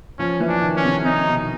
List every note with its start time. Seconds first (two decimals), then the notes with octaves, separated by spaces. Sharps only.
0.19 F3 C#4
0.40 E3
0.48 D4
0.62 D#3
0.76 C#4
0.84 C3
1.05 C3 D#4
1.27 B2